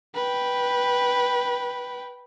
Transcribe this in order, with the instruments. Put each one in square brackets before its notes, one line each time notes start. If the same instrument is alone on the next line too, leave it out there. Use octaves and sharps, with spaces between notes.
[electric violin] B4 G5